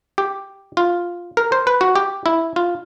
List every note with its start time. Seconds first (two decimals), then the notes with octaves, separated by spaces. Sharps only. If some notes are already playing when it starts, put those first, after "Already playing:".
0.18 G4
0.77 F4
1.37 A#4
1.52 C5
1.67 B4
1.81 F#4
1.96 G4
2.26 E4
2.56 F4